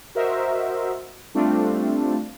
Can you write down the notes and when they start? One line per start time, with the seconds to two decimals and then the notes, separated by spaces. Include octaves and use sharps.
0.15 F#4 A#4 C5 D#5 E5
1.34 G3 A3 C4 D4 F4